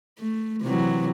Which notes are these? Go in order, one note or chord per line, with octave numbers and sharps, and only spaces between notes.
A3
C3 E3 F#3